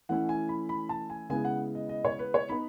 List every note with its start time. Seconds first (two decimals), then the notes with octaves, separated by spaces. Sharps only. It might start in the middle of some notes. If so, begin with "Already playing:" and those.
0.09 E3 A3 C#4 E4 F#5
0.29 G#5
0.49 B5
0.69 B5
0.89 A5
1.10 G#5
1.30 C#3 G#3 B3 E4 G#5
1.45 F#5
1.75 D#5
1.89 D#5
2.05 C#5
2.19 B4
2.34 C#5
2.49 B3 D#4 B5